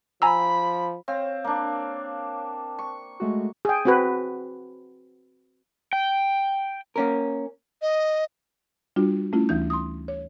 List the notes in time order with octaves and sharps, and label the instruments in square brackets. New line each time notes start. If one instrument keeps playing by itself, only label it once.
[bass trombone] F3 [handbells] G#5 A#5 E6 [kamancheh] B5
[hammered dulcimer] C4 [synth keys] C#5 F5
[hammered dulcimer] A#3 D4
C#6
[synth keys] G#3 A3 F#4
[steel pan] G#4 G5
C4 F#4 B4
[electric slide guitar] G5
[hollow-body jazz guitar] A#3 C#4 A#4
[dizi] D#5
[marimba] G3 D4 F4 F#4
A3 C#4 E4 F4
D2 E3 D#4 G6
C6 D#6
C#5